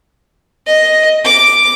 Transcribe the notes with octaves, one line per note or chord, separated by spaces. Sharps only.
D#5
D6